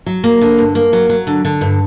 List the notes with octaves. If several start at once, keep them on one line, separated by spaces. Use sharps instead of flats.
F#3
A#3
D3
G2
A#3
F#3
F#3
D3
D3
G2